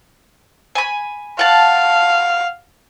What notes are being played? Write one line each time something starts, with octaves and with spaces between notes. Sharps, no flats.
G#5 B5
F5 F#5 A5